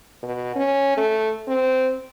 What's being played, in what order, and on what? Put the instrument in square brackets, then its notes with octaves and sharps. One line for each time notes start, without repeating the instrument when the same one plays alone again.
[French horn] B2
C#4
A3
C4